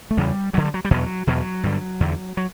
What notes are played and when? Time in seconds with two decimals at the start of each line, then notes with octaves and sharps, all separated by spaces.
0.11 A3
0.17 E2 C#3 G3
0.53 G2 D3 F#3
0.64 G3
0.74 F#3
0.85 G3
0.91 E2 B2 F#3
1.27 E2 B2 F#3
1.63 G2 D3
2.00 E2 D3
2.37 F#3